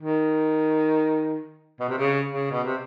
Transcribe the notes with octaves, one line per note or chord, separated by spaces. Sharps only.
D#3
B2
C3
C#3
C#3
B2
C3